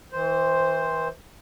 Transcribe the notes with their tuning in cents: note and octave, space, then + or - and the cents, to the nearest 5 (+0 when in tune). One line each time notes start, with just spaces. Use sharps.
E3 -35 C5 +0